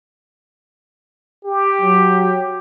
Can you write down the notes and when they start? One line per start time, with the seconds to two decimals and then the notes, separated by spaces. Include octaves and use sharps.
1.45 G4
1.81 F#3